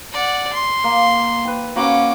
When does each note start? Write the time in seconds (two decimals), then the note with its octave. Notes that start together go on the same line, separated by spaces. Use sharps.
0.12 D5 F#5
0.53 C6
0.84 A#3
1.45 B4 G5
1.76 A#3 C#4 F#4 B4 D6